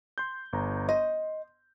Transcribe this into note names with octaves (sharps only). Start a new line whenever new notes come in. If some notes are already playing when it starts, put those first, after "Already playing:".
C6 G6
G1 A#5
D#5 C6